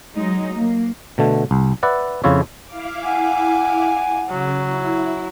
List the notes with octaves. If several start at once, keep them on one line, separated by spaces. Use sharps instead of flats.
F#3 G#3 D#4
A#3
B2 D3 A3
C2
B4 D5 E5 F#5
F2 C#3 E4 F4 C#5 E5
E4 F5 D6
F#5 G#5
C#3 F#3
E4